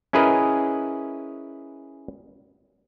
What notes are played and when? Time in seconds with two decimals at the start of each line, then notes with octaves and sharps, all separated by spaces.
0.13 C#4 E4 G#4 A#4 B4 D#5